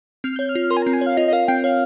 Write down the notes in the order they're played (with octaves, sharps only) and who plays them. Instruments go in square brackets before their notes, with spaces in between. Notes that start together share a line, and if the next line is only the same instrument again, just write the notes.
[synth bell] C4 [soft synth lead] F6
[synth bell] C#5 [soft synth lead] G6
[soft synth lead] F6
[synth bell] F4
[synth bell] A#4 [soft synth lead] C6
[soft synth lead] G#5
A#5
[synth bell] C4
[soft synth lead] G#5
[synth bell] C#5 [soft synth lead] F5
[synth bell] F4 [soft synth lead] D#5
[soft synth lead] D#5
[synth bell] A#4 [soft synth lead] F5
[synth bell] C4 [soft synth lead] G5
[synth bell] C#5 [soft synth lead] F5